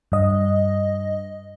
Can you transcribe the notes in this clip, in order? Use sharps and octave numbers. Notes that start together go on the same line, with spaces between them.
G2 D#5